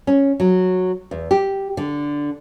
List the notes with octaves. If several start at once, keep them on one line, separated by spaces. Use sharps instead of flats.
C#4
F#3
E2
G4
D3